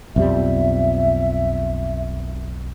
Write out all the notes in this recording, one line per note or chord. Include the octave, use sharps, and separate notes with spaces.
B1 F2 G3 E5